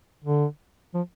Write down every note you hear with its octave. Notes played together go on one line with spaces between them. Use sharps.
D3
F3